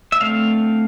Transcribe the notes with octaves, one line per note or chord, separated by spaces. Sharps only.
E5
D3 A3 C4 F5